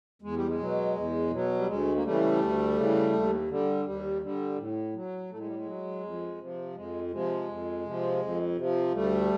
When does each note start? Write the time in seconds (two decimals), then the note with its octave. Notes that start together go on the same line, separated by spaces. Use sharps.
0.22 E2 G#3
0.35 G3
0.48 G#3
0.59 B2 F#3
0.95 E2
1.31 B2 F#3
1.58 G3
1.67 D2 G#3
1.95 A#3
2.04 C#3 E3 G3 A3
2.40 D2
2.76 C#3 E3
3.13 D#2
3.48 D3 G3
3.85 D#2 G3
4.22 D3 G3
4.58 A2
4.94 F#3
5.30 A2 A3
5.38 G#3
5.46 G3
5.55 G#3
5.66 F#3
6.02 F2
6.39 C3 F3
6.75 F2 G#3
7.11 C3 F3 G#3
7.48 F2
7.84 C3 F3
8.20 F2
8.56 C3 F3
8.93 D2 G3 A3